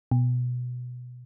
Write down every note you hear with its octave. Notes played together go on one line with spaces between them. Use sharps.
B2